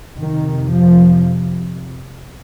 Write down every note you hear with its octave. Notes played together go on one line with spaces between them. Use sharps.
F2 C3 D#3
F3